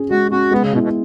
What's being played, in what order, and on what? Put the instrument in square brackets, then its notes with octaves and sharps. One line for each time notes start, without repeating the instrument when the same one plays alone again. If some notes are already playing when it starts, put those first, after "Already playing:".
Already playing: [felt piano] C#4 G#4
[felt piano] G#3 [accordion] F#4
[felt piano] C#4 G#4 [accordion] F#4
[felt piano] G#3 [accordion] B3
[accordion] C#3
[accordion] B2 [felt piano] B3 E4
[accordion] B2